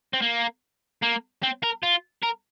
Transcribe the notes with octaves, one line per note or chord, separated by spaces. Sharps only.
C4
A#3
A#3
C4
A#4
F4
A#4